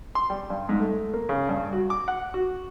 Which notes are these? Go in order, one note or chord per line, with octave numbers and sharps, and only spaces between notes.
C6
G3
G2
G#2
A3
A#3
C#3
G2
F#4
D6
F#5
F#4